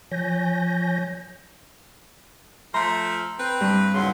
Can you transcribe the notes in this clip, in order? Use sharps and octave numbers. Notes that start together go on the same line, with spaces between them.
F3 C#5 G#5 G6 A#6
F3 A3 A#5 C6
C4 B4
G2
D#2 C#3 F#3 C6